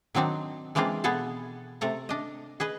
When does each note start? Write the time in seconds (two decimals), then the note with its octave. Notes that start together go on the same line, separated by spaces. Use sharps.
0.15 D#3 F#3 C4 D4 D#4
0.75 E3 G#3 A#3 C4 D4 F4
1.04 B2 B3 G#4 A4 A5
1.81 C3 A3 A4 A#5
2.09 D4 D#5
2.60 G#4 B4 D#5